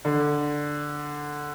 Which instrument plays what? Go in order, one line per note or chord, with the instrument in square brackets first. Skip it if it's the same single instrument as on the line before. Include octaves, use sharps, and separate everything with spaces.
[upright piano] D3